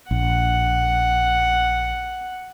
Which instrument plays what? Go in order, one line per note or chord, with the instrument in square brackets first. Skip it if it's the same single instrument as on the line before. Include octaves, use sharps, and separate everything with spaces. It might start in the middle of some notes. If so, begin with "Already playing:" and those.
[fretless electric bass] A#1 [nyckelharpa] F#5